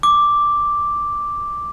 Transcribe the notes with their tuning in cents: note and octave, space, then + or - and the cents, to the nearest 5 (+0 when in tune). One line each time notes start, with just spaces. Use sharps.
D6 +0